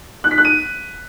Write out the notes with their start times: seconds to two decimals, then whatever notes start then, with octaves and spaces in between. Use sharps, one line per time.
0.24 F#6
0.31 B6
0.38 F#6
0.45 D#7